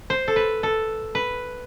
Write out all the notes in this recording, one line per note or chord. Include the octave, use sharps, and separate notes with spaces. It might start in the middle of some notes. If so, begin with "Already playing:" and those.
C5
A4
B4
A4
B4